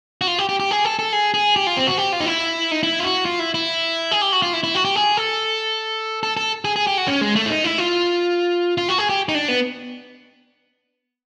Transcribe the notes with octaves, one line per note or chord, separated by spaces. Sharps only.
F#4
F4
G4
G4
G4
G#4
A4
A4
G#4
G#4
G4
F4
C4
F#4
G4
F4
D#4
E4
D#4
E4
F4
F#4
F4
E4
E4
G#4
G4
F#4
F4
E4
E4
F#4
G4
G#4
A4
A4
A4
G#4
G#4
G4
F#4
C#4
G#3
A3
E4
D#4
E4
F4
F4
F#4
G#4
G4
D#4
D4
B3